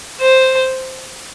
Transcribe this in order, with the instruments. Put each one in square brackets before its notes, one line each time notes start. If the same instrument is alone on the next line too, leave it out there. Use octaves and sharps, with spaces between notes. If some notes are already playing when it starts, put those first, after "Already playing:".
[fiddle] C5